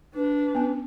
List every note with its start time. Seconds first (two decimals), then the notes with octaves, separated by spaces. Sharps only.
0.14 D4 B4
0.55 B3 C#4